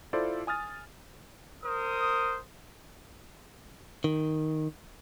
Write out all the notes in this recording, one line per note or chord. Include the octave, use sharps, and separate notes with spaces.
E4 F4 A4 C5 D5
G#5 D#6 F6 A6
A#4 C5 D#6
D#3